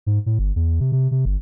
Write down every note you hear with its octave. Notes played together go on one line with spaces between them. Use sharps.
G#2
A2
G1
E2
C3
C3
C3
G1